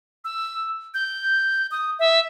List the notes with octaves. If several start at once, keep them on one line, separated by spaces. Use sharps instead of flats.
E6
G6
D#6
E5